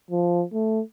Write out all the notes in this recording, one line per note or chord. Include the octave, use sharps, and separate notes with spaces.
F3
A3